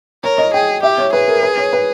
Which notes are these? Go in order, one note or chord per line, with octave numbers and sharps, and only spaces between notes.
A#4 C#5
D#5
G#4 G5
G4 E5
C#5
G#4 B4
A#4
B4
C#5
B4